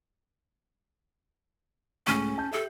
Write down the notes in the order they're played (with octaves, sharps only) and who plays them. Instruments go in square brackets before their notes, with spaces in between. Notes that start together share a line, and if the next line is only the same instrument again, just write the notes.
[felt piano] C#2 A2 C#6 [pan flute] C#4
[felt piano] A5 G6
[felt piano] G4 E5 [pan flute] A4